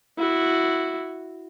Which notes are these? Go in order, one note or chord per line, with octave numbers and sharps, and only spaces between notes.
E4 F#4